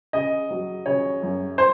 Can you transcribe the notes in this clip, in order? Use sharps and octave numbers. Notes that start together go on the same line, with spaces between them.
C#3 D#5
F#3
C#3 C#5
F#2
C5